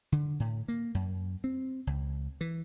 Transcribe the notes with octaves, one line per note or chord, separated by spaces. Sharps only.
D3
A2
A#3
F#2
C4
C#2
E3